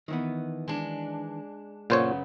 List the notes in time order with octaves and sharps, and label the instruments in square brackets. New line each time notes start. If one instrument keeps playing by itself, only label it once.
[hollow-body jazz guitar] D#3 E3 B3
[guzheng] G#3 D4
[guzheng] F#2 C#3 B3 [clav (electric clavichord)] A#2 C5 C#5